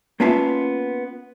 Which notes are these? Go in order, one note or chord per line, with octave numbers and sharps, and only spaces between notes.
A#3 B3 C#4 F4 E5 A5